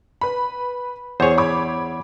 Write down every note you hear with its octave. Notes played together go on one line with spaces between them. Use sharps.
B4 B5
E2 G#4 C5 C#5
B5 D6 G#6